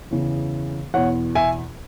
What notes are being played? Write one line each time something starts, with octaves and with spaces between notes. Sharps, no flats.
E2 C#3 E3
E2 B2 C#5 F#5
E5 G#5